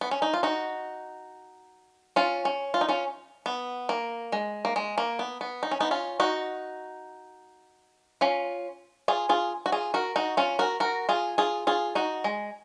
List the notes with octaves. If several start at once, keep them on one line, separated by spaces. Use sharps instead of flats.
B3
C#4
D#4
F4
D#4 F#4
C#4 F4
C#4
F4
D#4
C#4 F4
B3
A#3
G#3
A#3
G#3
A#3
B3
B3
D#4
C#4
B3 D#4
C#4 F4
D#4 F#4
C#4 F4
F4 G#4
F4 G#4
F#4
F4 G#4
F#4 A#4
D#4 F#4
C#4 F4
F#4 A#4
F#4 A#4
F4 G#4
F4 G#4
F4 G#4
D#4 F#4
G#3